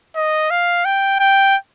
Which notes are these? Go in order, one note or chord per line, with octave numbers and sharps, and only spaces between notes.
D#5
F5
G5
G5